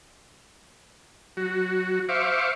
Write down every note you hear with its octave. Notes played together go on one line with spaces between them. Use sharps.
F#3 F#4
C5 E5 F5 C#6 D6